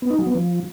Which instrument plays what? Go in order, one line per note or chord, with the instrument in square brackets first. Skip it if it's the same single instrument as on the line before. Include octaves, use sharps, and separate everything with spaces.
[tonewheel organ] B3
D#4
F#3
B3
F3